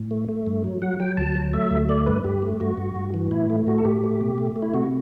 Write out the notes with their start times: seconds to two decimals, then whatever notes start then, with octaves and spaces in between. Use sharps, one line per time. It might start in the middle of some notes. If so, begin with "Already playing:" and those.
Already playing: A2
0.11 A3
0.29 A3
0.47 G2
0.64 F#3
0.82 F#3 F#5
1.00 F#3 G5
1.17 D2 A5
1.35 F#3
1.53 A3 E5
1.71 D2
1.89 A3 D5
2.06 G2 B4
2.24 G2 G4
2.42 A3
2.60 G2 F#4
2.78 G2
2.96 G2
3.14 E3
3.31 A2 E4
3.50 A3
3.67 A2 F#4
3.78 A4
3.85 A2 G4
4.04 A3
4.21 B2
4.38 A3
4.56 A3
4.62 E4
4.74 C3 F#4